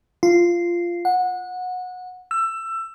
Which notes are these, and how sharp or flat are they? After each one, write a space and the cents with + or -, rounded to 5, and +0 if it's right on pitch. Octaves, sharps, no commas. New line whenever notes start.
F4 -10
F#5 -20
E6 +20